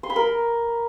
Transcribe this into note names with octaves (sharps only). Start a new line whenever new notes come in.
C6
B5
A#4